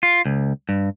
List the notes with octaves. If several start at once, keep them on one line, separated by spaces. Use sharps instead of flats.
F4
C#2
G2